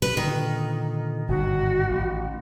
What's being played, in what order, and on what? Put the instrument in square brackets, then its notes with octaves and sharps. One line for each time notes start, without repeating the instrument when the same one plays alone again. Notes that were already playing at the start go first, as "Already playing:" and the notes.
[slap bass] B2 [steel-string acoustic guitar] B4
[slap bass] A#2 D3 [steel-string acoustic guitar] D#3
[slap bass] G1 G#2 B2 [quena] F#4
[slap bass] A1